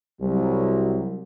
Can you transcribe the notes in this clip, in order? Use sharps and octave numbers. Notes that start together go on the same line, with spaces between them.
C2 F#3